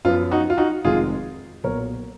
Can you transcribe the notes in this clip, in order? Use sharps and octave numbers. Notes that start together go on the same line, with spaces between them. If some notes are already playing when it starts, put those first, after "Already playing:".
F#2 F3 B3 F4
D#4 F#4
F4
D#4 F#4
F1 F2 D#3 G#3 F4 G#4
B1 A#2 F#3 B3 A#4 C#5